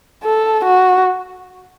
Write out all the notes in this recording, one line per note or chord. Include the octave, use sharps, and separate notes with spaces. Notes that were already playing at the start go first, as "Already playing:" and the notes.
A4
F#4